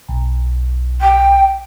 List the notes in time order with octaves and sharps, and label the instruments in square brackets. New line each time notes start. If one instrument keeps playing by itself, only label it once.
[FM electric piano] B1
[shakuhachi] G5